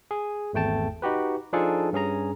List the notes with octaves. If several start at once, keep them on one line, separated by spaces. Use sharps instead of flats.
G#4
G#1 E2 A3 G5 A5
D#4 F#4 G4 B4
F3 D4 D#4 F4 G#4 A4
G2 C#4 G#4 A#5